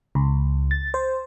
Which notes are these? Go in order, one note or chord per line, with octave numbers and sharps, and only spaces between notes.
C#2
A6
C5